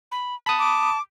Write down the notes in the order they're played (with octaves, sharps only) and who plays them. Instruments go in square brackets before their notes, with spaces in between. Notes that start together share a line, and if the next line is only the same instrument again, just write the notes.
[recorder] B5
[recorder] A5 [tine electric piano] B5 D#6
[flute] D6